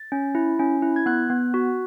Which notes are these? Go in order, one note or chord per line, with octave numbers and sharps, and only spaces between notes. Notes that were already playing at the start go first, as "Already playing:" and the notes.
Already playing: A6
C#4
E4
C#4
E4
G#6
B3 F#6
B3
F#4